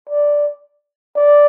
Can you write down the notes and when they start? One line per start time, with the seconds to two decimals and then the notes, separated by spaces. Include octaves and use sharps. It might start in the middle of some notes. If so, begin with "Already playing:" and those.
0.10 D5
1.16 D5